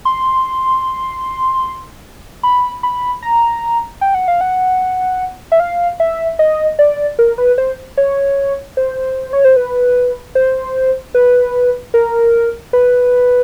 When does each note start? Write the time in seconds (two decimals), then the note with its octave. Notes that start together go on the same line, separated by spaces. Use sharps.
0.05 C6
2.43 B5
2.83 B5
3.22 A#5
4.01 G5
4.14 F#5
4.28 F5
4.41 F#5
5.52 E5
5.60 F5
6.00 E5
6.39 D#5
6.79 D5
7.19 A#4
7.38 B4
7.58 C5
7.98 C#5
8.77 C5
9.33 C#5
9.44 C5
9.56 B4
10.35 C5
11.15 B4
11.94 A#4
12.73 B4